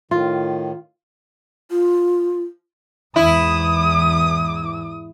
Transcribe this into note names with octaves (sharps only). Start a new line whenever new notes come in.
A2 D#3 F4
F4
E2 G#2 E4 D#6